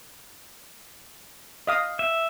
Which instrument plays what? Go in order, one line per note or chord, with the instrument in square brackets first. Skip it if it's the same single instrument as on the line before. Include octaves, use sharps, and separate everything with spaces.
[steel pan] D#5 F5 D#6
[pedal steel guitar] E5